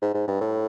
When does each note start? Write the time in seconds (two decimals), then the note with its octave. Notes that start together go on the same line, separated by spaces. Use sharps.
0.02 G#2
0.14 G#2
0.28 G2
0.41 A2